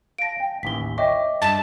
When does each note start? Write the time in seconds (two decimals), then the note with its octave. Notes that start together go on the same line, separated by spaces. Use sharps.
0.18 F5 A5 A#6 D7
0.40 G5
0.63 A1 D#2 E3 B6 G7
0.98 C#5 D#5 E5 G5 D6
1.42 G2 A5 A6 B6